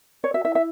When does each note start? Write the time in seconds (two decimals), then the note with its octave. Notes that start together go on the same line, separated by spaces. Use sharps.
0.23 C#5 D5
0.34 F#4 E5
0.45 E4 E5
0.55 E5